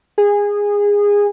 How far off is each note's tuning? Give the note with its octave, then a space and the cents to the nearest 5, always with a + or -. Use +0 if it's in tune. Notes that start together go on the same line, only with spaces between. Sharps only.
G#4 -20